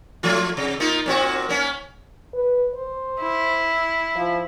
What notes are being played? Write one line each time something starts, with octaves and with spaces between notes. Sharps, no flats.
F3 A3 F4
C3
A#3 D#4 F4
A#2 C4 F#4
A#3 C#4
B4
C5
E4
F3